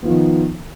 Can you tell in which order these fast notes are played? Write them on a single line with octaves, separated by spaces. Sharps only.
B3 F3 F4 D#3